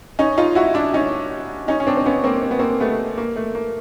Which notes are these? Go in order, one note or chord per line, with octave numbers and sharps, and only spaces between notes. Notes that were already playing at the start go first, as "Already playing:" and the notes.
C#4 D#4
D#4 F4
E4 F#4
D4 E4
C#4 D#4
C#4 D#4
C#4
C4 D4
C4
B3 C#4
A#3 C4
C4
B3
A#3 C4
A3 B3
A#3
A3
A#3